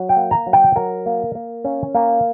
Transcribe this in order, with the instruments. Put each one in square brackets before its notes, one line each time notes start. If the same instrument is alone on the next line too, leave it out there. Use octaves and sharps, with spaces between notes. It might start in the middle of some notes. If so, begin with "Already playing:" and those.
Already playing: [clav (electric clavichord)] F#3
G5
A#3
A#5
F#3
G5
F#3 A#4
A#3
A#3
C#4
A#3